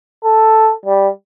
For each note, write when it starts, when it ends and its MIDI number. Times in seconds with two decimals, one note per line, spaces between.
0.24 0.72 69
0.85 1.08 55